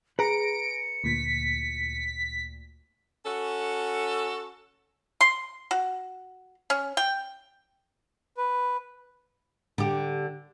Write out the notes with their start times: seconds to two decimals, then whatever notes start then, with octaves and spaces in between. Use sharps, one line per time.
0.19 G#4 B4 A#5 A#6 C#7 D7
1.04 D2 A#2 B6
3.23 C#4 F#4 A4
5.21 C6
5.71 F#4
6.70 C#4
6.97 G5
8.37 B4
9.78 D3 G4